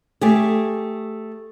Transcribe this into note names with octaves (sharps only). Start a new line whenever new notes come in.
A3 G4 G#4